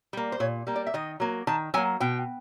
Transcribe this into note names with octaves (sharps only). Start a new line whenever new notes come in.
G3 A#3
C5
A#2 C#5
G3 A#3
D5
E5
D#3 D#5
F#3 A#3
D#3 A5
F#3 A#3 G#5
B2 G5